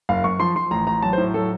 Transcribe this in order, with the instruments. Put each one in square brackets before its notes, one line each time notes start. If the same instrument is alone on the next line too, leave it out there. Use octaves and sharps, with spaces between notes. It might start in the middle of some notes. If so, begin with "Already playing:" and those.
[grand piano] F#1 F5
F#2 C#6
F3 C6
F3 C6
A1 A#5
A1 A#5
F#3 A5
C5
A2
F#3 A4